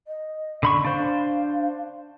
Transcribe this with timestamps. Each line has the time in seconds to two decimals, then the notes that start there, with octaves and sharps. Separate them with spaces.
0.07 D#5
0.63 D3 B5 C#6
0.85 D4 C5 F5